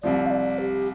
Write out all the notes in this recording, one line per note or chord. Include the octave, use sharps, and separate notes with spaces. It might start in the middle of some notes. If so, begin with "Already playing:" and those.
C2 C3 F3 D5
F5
D5
G4